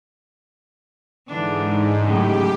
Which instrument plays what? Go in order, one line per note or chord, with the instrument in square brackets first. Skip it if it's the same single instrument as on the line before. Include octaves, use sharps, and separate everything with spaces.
[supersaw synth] G#2 [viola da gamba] D3 E3 D4
[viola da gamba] F#2 A2 C#3 [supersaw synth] G4